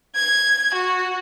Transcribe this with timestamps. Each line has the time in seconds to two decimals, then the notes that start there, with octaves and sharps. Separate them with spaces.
0.15 G#6
0.74 F#4